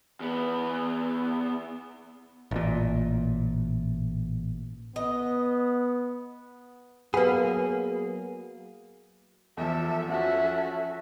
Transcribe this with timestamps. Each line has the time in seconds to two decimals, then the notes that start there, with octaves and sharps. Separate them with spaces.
0.20 E2 B3
2.51 A1 A#2
4.96 B3 D#5
7.14 F#3 A#3 B3 G#4 B4 B5
9.57 E2 F3 A4 E5
10.09 F3 C#4 F#4 A4 E5